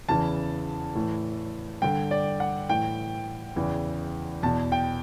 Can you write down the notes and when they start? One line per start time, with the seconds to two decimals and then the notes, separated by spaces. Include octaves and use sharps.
0.09 E2 C#3 E3 A5
0.95 A2 E3
1.82 G2 D3 G5
2.11 D5
2.40 F#5
2.69 A2 E3 G5
3.56 E2 C#3 E3
4.43 E2 B2 A5
4.72 G5